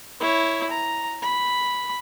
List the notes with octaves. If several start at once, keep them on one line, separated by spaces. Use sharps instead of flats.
E4 C#5
A#5
B5